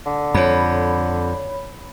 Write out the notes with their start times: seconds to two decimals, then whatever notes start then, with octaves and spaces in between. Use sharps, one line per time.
0.06 D3
0.34 F2 C#5 B5